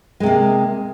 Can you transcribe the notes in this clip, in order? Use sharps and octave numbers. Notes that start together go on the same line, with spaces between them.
C3 G#3 A#3